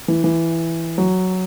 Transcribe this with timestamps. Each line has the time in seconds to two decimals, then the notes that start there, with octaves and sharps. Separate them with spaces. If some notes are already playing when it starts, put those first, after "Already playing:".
0.08 E3
0.24 E3
0.98 F#3